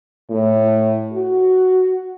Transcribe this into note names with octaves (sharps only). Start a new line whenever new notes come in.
A2
F#4